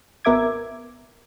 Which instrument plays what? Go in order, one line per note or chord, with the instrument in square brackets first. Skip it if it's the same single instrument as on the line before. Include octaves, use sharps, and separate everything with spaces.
[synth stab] G#1 B3 A#4 E5 D6 G#6